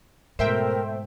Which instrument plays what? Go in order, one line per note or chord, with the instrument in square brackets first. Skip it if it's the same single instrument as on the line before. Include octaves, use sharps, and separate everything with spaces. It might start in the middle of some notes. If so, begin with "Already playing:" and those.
[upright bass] G#2 [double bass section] B2 A3 [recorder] A#4 [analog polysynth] C5 E5 G5